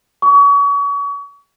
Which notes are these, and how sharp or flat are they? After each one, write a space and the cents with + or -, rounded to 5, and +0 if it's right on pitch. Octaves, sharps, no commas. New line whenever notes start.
C#6 +35